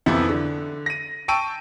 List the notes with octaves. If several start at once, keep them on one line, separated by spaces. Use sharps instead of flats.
F2 C3 E3 F3 B3 E4
D3
A#6 D#7
G5 A5 C#6 E6 D7 D#7